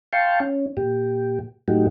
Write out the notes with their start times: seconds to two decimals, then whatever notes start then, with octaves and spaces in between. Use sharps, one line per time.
0.13 F5 G5 A5 C6 C#6
0.40 C#4
0.77 A#2 G4
1.68 A2 F#3 A3 D#4 F#4 G4